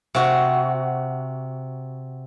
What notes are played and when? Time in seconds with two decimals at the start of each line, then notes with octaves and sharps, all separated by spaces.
0.15 C3 F#4